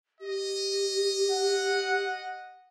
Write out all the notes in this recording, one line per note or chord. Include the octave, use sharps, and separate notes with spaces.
G4 D#5
F#5